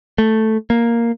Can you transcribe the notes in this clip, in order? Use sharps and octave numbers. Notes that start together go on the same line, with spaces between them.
A3
A#3